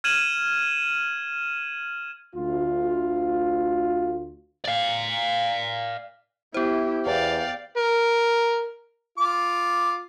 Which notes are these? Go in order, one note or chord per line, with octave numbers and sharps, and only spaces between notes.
F6 G#6 D#7 E7 F#7
D2 F4
D5 F5
B3 E4 G4 C5
E2 D5 F5 G5
A#4
F4 D6